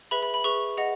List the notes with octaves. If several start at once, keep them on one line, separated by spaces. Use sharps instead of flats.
G#4 B4 E5 B5
B5
B5
G#4 B4 E5 C#6
G#4 D#5 F#5